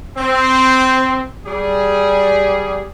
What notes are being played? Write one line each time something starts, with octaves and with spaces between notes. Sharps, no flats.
C4
G3 G#4